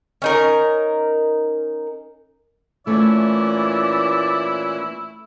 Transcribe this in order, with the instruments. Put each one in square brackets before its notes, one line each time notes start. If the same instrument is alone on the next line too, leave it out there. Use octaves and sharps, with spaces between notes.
[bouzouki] C#4 D#4 A#4
[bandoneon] A#2 E3 C#4 [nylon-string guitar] A3 C#5 [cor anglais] E4 [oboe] D5